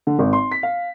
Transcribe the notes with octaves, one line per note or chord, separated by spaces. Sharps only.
D3
G#1
C6
B6
F5